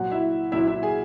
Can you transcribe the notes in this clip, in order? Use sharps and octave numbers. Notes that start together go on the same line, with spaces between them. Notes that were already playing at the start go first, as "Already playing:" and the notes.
Already playing: A#2 F#3 F#4 F#5
E4 E5
A#2 F#3 E4 E5
E4 E5
G#4 G#5